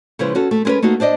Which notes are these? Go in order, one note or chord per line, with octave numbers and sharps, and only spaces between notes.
C#3 F3 G#3 E4 B4
C#4 F#4 A4
A3
G#3 B3 C#4 A#4 B4
A3 A#3 D#4 F#4
D4 C5 D5 D#5